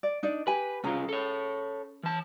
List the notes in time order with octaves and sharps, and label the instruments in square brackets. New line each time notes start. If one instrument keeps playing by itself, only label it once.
[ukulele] D5
D4 D#4 D5
[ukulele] G4 G#5 [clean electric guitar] B4
[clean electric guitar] C2 C#3 F4 [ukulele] C#4 G#4 A#5
[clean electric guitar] A4 C#5
E3 A5